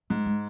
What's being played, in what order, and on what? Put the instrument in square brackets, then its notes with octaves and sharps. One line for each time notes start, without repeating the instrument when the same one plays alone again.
[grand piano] G#2 [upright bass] A3
[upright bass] G#3